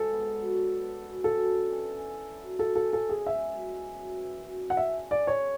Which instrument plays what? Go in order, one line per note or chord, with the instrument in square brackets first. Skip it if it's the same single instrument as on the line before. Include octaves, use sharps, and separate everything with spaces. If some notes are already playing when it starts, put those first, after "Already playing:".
Already playing: [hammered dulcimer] G#2 F#4 [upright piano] A4
[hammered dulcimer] B3
F#3
D4
B3
F#2
[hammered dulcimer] F#2 [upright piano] A4
[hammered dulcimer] D4
E3
C#4
E4
F#3
[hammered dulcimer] F#3 [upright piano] A4
[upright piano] A4
[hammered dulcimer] C#4
[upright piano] A4
[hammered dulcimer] E4
[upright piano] G#4
[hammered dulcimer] G#3 [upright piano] E5
[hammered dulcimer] F#2
G#3
F#2
E3
F#2
D4
[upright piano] F#5
E5
[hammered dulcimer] C#3
C#3
[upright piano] D5
[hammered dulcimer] D4 [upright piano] C#5